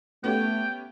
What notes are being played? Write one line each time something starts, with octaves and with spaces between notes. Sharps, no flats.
A3 B3 C#4 G4 G5